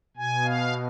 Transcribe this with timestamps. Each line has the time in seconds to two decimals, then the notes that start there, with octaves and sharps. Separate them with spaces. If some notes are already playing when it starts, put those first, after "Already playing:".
0.17 B2 G#5
0.44 F5